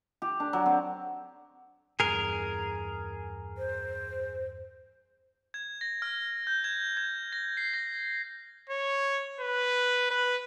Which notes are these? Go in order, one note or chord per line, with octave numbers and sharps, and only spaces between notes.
G4
D4
F#3
C4
E2 G2 G#4 A#4
C5
G#6
A#6
F6
G6
G#6
G#6
A#6
C7
A#6
C#5
B4
B4